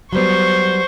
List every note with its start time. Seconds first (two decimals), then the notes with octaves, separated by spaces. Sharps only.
0.13 F#3 G3 B3 C5 C#6